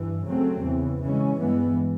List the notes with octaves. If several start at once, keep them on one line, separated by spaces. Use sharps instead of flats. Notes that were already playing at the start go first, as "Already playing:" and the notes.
Already playing: G2 E3
C#3 F#3 A3 C4
E2 C#3 E3
C#3 E3 G#3 C#4
G2 E3 G#3 B3